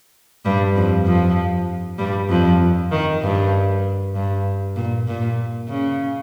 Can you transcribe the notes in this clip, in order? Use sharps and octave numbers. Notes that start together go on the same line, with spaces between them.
G2 G3
F2 F3
F2 F3
G2 G3
F2 F3
D#3
G2
G2
A#2
A#2
C#3